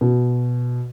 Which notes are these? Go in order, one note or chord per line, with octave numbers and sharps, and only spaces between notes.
B2